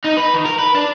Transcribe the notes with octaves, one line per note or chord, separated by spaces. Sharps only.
D#4
B4
D#3
A#4
B4
D4